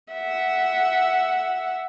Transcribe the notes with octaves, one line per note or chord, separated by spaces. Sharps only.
E5 F#5